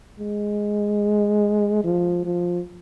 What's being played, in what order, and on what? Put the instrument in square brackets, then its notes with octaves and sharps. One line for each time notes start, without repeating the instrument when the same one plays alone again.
[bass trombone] G#3
F3
F3